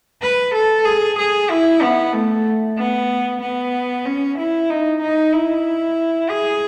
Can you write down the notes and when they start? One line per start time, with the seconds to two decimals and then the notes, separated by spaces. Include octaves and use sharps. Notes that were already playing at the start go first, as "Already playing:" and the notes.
0.22 B4
0.54 A4
0.85 G#4
1.18 G#4
1.50 E4
1.82 B3
2.13 A3
2.78 B3
3.41 B3
4.06 C#4
4.38 E4
4.70 D#4
5.01 D#4
5.33 E4
6.30 G#4